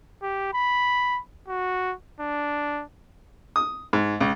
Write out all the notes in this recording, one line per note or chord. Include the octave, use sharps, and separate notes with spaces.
G4
B5
F#4
D4
D#6
G#2
C#2